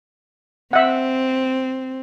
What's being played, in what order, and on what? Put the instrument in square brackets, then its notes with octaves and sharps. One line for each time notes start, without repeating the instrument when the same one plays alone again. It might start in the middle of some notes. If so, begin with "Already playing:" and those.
[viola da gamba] C4 [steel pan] E5 F#5